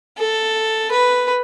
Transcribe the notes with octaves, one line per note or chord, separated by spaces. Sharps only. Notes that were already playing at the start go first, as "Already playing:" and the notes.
A4
B4